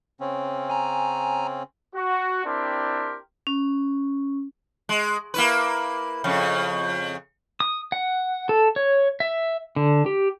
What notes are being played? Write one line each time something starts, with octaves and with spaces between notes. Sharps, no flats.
C#3 C4 C#4
G#5 A#5
F#4
C4 D4 E4 G4 A#4 C6
C#4
G#3
A#3 E4 B4
F2 C#3
D#6
F#5
A4
C#5
E5
D3
G4